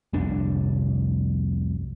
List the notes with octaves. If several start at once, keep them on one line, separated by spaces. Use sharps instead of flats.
F1 C2 D4